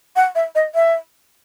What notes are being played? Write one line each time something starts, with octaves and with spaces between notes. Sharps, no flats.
F#5
E5
D#5
E5